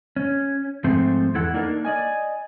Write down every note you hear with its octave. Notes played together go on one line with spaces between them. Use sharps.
C#4
G#2 F3 A3 C4 C5
E2 E4 A4 F#5
A#3 D4 D#4 A4 A#4
D5 D#5 G#5